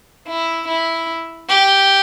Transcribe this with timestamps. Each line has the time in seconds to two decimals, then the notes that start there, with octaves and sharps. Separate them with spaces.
0.28 E4
0.68 E4
1.49 G4